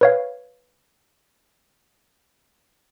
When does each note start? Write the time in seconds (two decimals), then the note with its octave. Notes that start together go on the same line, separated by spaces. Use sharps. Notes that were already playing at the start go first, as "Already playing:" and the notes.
0.01 B4 C#5 F5